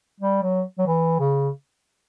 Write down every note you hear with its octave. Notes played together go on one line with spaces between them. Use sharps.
G3
F#3
F#3
E3
C#3